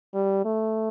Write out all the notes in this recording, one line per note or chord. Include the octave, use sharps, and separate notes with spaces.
G3
A3